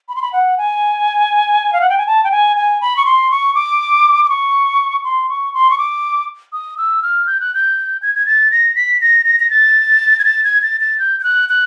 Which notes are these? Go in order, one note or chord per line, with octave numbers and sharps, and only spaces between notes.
B5
C6
B5
F#5
G#5
F5
F#5
G5
G#5
A5
G5
G#5
G#5
B5
C#6
C6
C#6
D6
D6
C#6
C6
C#6
C6
C#6
D6
D#6
E6
F6
G6
F#6
G6
G#6
G#6
A6
A#6
B6
A#6
A#6
A#6
A6
G#6
A6
G#6
A6
A6
G6
G6
F#6
F#6